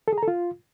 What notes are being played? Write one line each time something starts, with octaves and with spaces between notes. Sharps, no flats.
A4
G#4
A#5
A4
F4